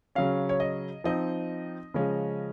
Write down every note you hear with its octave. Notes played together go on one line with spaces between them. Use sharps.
C#3 F#3 C#4 F5
C#5
D#5
F3 C4 D#4 D#5
C#3 F3 G#3 C#4